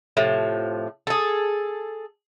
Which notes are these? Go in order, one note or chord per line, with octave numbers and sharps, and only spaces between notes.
A2 C3 F3
G#4 A4